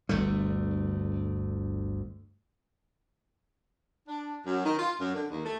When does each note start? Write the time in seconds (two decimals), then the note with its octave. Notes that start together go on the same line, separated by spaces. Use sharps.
0.09 G1 D2 A3
4.06 D4
4.45 F#2
4.64 D#3
4.78 F4
4.99 F#2
5.13 D3
5.30 D#2
5.44 A3